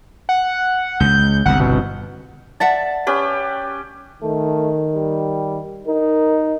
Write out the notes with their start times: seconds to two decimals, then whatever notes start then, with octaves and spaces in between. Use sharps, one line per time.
0.29 F#5
1.00 C#2 G6
1.46 G1 C2 F#5
1.60 B2
2.60 D5 E5 F#5 A5
3.07 C#4 G4 B4
4.23 D#3 A3
4.95 G3
5.87 D#4 A#4